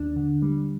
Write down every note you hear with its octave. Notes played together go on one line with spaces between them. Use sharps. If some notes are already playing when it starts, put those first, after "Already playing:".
Already playing: D#2 D4
D3
G3